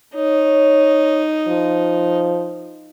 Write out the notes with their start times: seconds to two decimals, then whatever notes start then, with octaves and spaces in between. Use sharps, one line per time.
0.15 D#4 C#5
1.48 F3